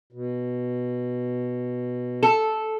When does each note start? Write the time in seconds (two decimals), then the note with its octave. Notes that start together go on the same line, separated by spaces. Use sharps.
0.12 B2
2.23 A4